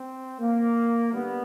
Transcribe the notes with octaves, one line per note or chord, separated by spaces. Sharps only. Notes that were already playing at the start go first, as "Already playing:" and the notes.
Already playing: C4
A#3
D3 G3 B3